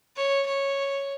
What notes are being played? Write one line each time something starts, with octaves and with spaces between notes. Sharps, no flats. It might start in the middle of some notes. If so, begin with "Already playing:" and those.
C#5
C#5